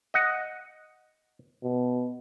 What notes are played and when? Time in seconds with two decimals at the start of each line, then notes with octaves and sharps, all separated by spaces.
0.14 D#5 F#5
1.63 B2